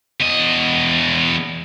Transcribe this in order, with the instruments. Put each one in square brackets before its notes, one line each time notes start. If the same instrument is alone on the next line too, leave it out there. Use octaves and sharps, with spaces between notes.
[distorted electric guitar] E2 D#5